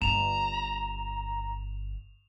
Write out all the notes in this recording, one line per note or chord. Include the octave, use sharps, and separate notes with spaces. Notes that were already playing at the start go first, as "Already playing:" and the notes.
G1 A#5 E7 F7